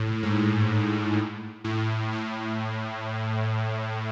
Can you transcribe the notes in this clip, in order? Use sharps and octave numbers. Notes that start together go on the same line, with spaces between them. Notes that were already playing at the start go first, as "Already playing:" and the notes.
Already playing: A2
G#2
A2
A2